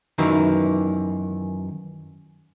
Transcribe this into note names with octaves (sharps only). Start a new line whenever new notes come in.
F#2 D#3 E3